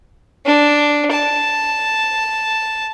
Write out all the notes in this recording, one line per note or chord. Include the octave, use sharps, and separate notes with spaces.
D4
A5